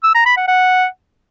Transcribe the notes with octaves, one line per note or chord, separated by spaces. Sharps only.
E6
A#5
B5
F#5
F#5